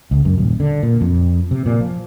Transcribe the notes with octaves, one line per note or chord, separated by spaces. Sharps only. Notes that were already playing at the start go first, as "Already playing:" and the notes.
C#2
F#2
D#1
D3
A#2
F2
C3
A#2
F3